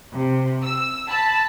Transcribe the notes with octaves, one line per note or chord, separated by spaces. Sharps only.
C3
E6
A5 B5